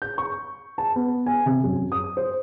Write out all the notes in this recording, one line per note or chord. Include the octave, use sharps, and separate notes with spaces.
G6
C#6
A5
B3
G#5
C3
F#2
D#6
C5